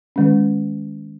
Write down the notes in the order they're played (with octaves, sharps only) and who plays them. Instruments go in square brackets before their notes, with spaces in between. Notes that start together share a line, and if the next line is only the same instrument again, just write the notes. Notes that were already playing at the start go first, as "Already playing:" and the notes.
[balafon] D#3 G#3 C#4